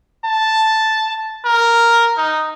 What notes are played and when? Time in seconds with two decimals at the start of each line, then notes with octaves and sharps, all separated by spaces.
0.25 A5
1.45 A#4
2.17 D#4